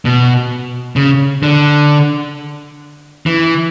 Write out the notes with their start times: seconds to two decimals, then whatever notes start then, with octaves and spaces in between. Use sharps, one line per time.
0.05 B2
0.96 C#3
1.43 D3
3.26 E3